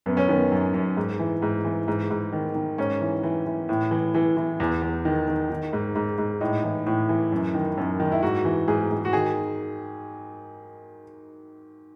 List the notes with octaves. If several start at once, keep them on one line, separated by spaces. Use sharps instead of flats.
F#2 B3
C#4
D#3 B3
F#2
F#2
G#2
E3
G#2
E3
G#2
G#2
D#3
D#3
G#2 C#4
E3
E3
E3
A2
E3
E3
E3
E2
E2
D#3
D#3
D#3
G#2
G#2
G#2
A2 D#4
E3
A2
E3
F#2
D#3
F#2
D#3
E4
G#2 F#4
E3
G#2 G#4
G#2
F#4
D#3 G#4